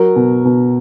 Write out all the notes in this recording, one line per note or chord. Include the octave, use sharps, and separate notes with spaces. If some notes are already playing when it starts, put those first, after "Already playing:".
Already playing: F#3 A#4
B2
B2